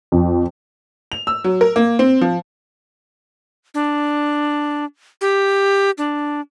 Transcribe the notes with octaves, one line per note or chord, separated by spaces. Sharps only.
F2
F7
E6
F#3
A#4
A#3
C4
F3
D4
G4
D4